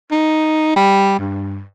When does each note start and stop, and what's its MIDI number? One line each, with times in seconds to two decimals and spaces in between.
0.11 0.72 63
0.76 1.16 55
1.19 1.62 43